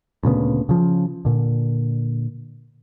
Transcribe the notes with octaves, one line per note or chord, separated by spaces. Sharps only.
D2 A#2 C#3 B3
C#3 F3
A#2 D3